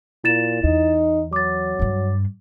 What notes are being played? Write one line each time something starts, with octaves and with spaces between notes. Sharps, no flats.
A#2 E4 A6 E7
E2 D#4
F#3 D6 A6
G2 D4